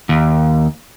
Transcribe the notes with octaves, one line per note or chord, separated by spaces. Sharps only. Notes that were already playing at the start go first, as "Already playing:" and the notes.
D#2